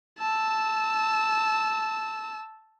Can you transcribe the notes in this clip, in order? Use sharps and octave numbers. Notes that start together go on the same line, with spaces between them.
A5 E6